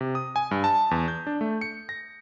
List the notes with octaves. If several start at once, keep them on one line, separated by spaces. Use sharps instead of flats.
C3
D#6
G#5
G2
A5
E2
G6
D4
A3
C#7
A#6